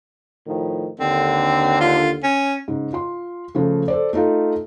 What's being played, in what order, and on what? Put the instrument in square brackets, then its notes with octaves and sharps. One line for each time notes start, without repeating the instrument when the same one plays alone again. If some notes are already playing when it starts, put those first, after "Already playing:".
[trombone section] A2 D#3 F3
[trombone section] D#2 D3 [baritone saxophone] C4
[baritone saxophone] F4
C#4
[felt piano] G#2 C#3
F4 C6
C#3 F3 A3
A4 C5 D5
A3 D#4 F4